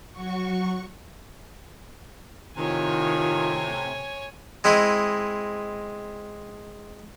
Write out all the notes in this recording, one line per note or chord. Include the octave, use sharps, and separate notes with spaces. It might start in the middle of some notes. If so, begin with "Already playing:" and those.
F#3 F#4 C#6
A2 C3 D#3 F4 C#5 G#5
G#3 C4 E4 D#5